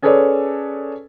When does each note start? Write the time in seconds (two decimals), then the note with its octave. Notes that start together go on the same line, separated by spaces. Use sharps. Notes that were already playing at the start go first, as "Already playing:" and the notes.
0.02 C#4 G#4 A4 B4 C#5 D5